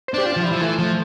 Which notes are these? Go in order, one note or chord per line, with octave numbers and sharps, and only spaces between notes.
C5
D4 G4
F4
F3
E4
F3
E3 A3
F3